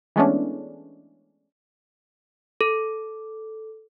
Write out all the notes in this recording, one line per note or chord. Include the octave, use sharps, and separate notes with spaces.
E3 G#3 A3 B3 C#4 D4
A4